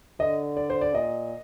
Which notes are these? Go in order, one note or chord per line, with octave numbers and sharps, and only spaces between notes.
D3 D#5
D5
C5
D5
A#2 D#5